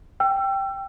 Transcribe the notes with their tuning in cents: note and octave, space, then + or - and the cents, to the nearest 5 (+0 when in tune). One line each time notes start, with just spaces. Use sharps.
G5 +0 E6 +35